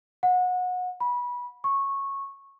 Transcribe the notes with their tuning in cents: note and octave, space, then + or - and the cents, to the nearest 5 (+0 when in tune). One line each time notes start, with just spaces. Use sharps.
F#5 -25
B5 -20
C#6 -15